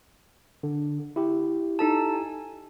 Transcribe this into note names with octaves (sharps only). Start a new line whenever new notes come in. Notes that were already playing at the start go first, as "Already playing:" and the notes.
D3
E4 G4
D#4 A4 A5
G#5